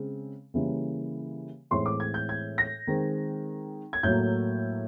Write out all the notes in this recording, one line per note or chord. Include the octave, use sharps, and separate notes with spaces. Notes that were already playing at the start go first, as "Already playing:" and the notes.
Already playing: C#3 G#3 C4
C#3 E3 G3 A#3
A2 E3 G#3 C4 C6
D6
G#6
G6
G#6
A#6
D#3 G#3 C4
G#6
A2 F#3 A#3 G6